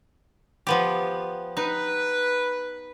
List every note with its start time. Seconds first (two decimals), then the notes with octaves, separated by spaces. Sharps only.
0.67 F3 B3 G4
1.57 D#4 B4